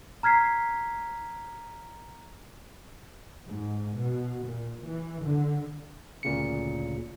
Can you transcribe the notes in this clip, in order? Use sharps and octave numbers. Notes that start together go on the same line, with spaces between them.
A#5 F6 G#6 B6 C7
G#2
B2
A#2
E3
D3
D2 A#2 C#3 C#7